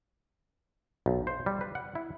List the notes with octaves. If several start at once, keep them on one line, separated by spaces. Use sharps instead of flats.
B1
C5
G3
B4
F#5
E4